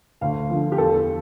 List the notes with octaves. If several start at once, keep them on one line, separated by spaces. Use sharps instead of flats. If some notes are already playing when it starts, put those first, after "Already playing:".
D2 F5
D3 F3
G4
E2 A4